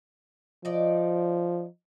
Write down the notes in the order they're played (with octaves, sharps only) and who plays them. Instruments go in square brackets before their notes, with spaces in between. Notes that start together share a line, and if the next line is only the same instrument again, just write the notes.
[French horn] F3 [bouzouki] D#4 D5